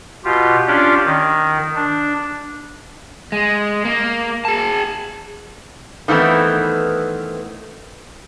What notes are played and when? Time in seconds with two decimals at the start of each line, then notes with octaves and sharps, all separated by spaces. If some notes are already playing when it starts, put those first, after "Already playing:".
0.25 B2 F4 G4
0.67 C#4 D4 F4 G4 D5
1.05 D#3
1.76 D4
3.32 G#3
3.85 A#3
4.45 G#4 A5
6.08 D#3 E3 A3 B3 C4